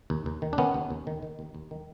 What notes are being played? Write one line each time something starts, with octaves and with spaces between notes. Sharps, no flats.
D#2
D#2
D#3
D4
D#3 B3 C#4
D#2
D#2
D#3
D#3
D#2
D#2
D#3